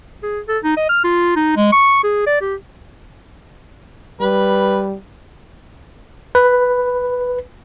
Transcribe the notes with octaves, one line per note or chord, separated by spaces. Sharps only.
G#4
A4
D#4
D#5
F6
F4
D#4
G#3
C#6
G#4
D5
G4
G3 B4
B4